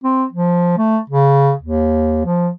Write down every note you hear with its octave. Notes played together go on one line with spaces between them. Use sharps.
C4
F3
A3
C#3
D#2
F3